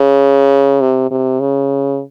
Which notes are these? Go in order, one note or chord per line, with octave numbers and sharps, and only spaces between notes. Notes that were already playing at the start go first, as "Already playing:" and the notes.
Already playing: C#3
C3
C3
C#3